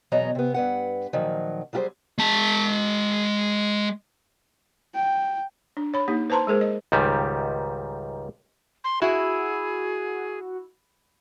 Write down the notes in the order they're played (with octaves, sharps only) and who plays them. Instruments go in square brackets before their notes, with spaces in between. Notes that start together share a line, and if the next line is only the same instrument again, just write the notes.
[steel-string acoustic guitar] E2 B2 F#3 C#5 D#5 A#5
C3 B3
G2 B4 F#5
A#2 D#3 F3 F#3
F#3 G3 F4 G4 G#4 C5
[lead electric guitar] G#3 A5
[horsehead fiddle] G5
[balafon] D4
C#5 B5
A#3 D#4 G4
B4 C5 A5 A#5 C6
G#3 G#4 A#4 C5
D#5
[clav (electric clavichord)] C#2 G#2 D#3 G3
[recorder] C6
[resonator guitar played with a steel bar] E4 [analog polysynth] F#4 [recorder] G#4